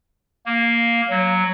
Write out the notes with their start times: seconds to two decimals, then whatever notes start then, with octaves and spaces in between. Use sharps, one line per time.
0.46 A#3
1.10 F#3